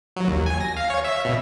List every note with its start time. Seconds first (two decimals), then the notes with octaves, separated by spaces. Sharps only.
0.16 F#3
0.28 D#2
0.46 G#5
0.60 A#6
0.77 F5
0.90 C#5
1.04 E5
1.25 B2